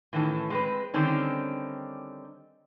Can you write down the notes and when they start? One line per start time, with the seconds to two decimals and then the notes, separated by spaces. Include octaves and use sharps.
0.13 A2 D#3 E3 C#4 A4
0.50 G#3 C4 B4
0.94 D3 D#3 G3 C4 C#4 D#4